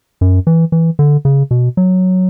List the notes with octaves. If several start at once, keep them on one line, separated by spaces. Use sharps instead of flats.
F#2
E3
E3
D3
C#3
B2
F#3